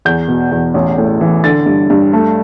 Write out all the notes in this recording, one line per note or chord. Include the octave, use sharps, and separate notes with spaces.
E2 G6
B2
E2
A1
A2
E3
D3 A6
G2
G2
A3